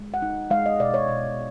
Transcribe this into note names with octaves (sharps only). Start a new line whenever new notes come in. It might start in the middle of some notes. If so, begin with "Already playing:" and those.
Already playing: G#3
F#5
D#4
G#3 F5
D#5
B2 D5
C#5
B2